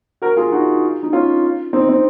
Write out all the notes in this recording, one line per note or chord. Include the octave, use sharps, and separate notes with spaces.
F#4 A#4
F4 G#4
D#4 F#4
D#4
C#4 F4
C4 D#4
C4